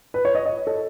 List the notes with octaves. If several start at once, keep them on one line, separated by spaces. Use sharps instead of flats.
B4
C#5
D#5
D#5
A4